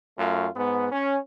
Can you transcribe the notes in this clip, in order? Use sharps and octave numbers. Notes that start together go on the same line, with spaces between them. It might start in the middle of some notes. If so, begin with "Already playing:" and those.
F#2 A3 F4
G#2 B3
C#4